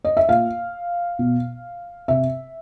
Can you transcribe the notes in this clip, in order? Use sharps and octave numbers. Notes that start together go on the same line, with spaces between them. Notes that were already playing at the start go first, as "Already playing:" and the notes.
D#5
E5
A#2 F5
B2
C3 E5